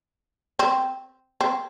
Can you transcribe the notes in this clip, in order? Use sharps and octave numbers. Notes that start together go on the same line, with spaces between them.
C4
C4